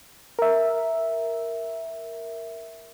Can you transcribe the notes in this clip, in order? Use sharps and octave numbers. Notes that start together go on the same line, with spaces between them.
A#4 E5